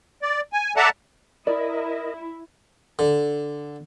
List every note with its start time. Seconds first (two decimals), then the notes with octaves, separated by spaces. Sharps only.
0.22 D5
0.53 G#5
0.77 A4 D5 E5 F#5 A5 A#5
1.47 E4 A#4 D5 D#5
2.99 D3